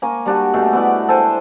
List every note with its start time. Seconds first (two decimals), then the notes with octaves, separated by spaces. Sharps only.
0.02 A#3 G#5 C#6
0.26 G3 D4 F#4
0.54 B2 A3 G#4
0.73 B3 E4 D5
1.09 A4 C5 G5 G#5